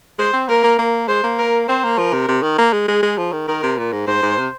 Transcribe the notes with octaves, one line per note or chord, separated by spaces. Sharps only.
G#3 C5
C4
A#3 A#4
A#3
A#3
G#3 C5
A#3
A#4
C4 C5
A#3
F3 A#4
C3
C3
D#3
A#3
G#3
G#3 G#4
G#3
F3
D#3
D#3 A#4
C3
A#2
G#2
G#2 C5
G#2
C3